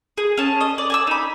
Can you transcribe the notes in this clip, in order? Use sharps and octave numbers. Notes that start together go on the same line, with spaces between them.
G#4
C#4 A5
D#5
D5
G#5 A5 E6
D#4 B5